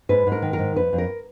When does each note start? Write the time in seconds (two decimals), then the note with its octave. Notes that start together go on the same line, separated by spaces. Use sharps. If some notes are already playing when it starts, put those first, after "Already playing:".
0.09 G#2 B4
0.27 G#2 A#4
0.42 D#3
0.53 A#4
0.59 G#2
0.76 F2 B4
0.93 F2
0.98 A#4